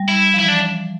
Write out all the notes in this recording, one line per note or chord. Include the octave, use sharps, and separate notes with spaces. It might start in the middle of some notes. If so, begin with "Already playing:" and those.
Already playing: G3
E4
F3
E3 E4
D4